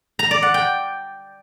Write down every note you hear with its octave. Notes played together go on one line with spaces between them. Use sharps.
A#5
D5
F#5
G5